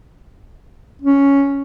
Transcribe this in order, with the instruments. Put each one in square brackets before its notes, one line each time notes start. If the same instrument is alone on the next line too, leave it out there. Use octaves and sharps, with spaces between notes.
[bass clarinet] C#4